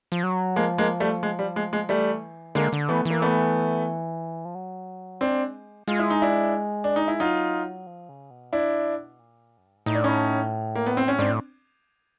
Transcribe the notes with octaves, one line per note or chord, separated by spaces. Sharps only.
F3
F#3
F3 G#3 A#3
G#3 A#3
G3 A3
G#3
G3
G#3
G#3
E3 G3 A3
D3 G#3 A#3
D3
E3 A3 B3
E3 A#3
A3 B3
F3
F#3
G#3 C4 D4
G#3 F4
E4
D#4
D4 E4
D4
D#4
E4
F#3 D#4 F4
F3
C#3
B2
D4 E4
A#2
F#2
G2
G#2
A2 D#4
D4
C#4 D#4
A#3
B3
C4
C#4
G#2 C4 D4
A2